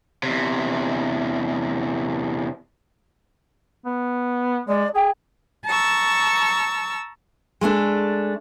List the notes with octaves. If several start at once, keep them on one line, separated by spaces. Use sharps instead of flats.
E2 C3
B3
G#3 D5
G#4 G5
A5 A#5 C#6 E6
G#3 A3 C#4 D4